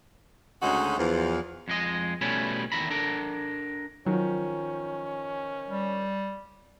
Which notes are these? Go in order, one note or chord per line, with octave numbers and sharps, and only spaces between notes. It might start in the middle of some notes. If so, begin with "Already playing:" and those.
D2 C#3 G#3 C#4 D#4 F#4
E2 F3
F2 G#3 D#5
B2 G3 A3 C#4 E4 B4
E2 D#3 E5 A#5 B5
D4 A4 A#4
D#3 F3 F#3 C#4
G3